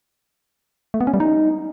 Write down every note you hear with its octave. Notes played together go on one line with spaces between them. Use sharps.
A3
B3
C#4
G3
D#4